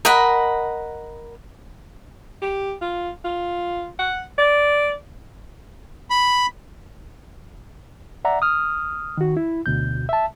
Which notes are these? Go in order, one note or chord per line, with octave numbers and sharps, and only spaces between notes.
A#4 D#5 F#5 B5
G4
F4
F4
F#5
D5
B5
D5 E5 F#5 A#5
D#6 F6
D#3 F#4
E4
D2 B2 G6
E5 A5